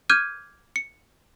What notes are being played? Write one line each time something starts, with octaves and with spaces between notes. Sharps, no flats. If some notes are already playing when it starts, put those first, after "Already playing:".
D6 F6 G6 G#6 D#7
C#7